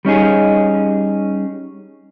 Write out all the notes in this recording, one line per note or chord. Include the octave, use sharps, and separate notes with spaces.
G3 C#4 D#4 G#4